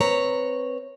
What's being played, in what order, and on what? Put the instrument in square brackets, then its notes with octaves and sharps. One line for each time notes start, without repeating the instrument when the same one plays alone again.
[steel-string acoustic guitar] C4 B4 C#5 A#5